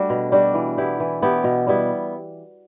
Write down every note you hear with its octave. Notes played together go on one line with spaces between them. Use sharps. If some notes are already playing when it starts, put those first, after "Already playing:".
Already playing: G3 A3 D4 F#4
B2
G3 D4 F#4
E3
B3 E4 G4
E3
B3 E4 G4
B2
G3 B3 E4